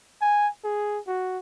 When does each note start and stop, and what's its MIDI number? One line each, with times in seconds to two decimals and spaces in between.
0.22 0.48 80
0.64 0.99 68
1.07 1.39 66